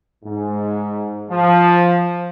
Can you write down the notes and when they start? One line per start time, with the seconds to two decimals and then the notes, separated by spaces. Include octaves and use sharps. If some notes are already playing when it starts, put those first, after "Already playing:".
0.25 G#2
1.30 F3